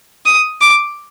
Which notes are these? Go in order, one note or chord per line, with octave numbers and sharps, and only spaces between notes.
D#6
D6